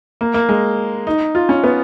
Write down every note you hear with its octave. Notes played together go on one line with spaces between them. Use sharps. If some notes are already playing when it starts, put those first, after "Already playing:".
A#3
A#3
G#3
D#4
F4
C#4
B3